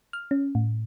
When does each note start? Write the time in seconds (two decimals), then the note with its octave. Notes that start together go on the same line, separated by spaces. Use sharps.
0.13 F6
0.31 C#4
0.55 A2